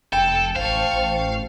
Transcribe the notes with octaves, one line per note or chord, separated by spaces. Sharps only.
F1 A4 G5
A1 C5 F5 A5 C#6
A1